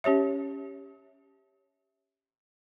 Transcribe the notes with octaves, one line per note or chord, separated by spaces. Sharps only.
C#4 G4 C#5 E5